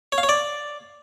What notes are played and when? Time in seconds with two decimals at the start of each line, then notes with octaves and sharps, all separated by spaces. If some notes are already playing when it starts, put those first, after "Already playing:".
0.12 C#5
0.18 F5
0.23 C#5
0.29 D5